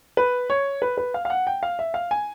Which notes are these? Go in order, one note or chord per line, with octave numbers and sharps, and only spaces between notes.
B4
C#5
B4
B4
F5
F5
F#5
G5
F5
E5
F5
G#5